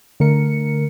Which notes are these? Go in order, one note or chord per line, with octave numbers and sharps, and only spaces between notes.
D3 A3 A#4 C#7